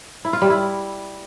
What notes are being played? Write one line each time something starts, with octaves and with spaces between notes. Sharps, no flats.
E4
F4
G3
E4